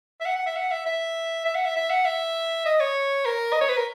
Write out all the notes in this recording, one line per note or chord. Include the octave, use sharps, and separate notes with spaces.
E5
F#5
F#5
E5
F#5
E5
E5
E5
F#5
E5
E5
F#5
E5
D#5
C#5
A#4
D#5
C#5
B4
A#4